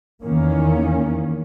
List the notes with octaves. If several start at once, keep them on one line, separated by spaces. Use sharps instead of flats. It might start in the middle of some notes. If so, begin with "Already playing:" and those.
E2 D#3 A#3 C#4